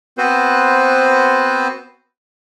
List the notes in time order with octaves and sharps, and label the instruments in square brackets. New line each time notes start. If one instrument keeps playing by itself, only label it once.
[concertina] B3 C4 F#4 B4 C5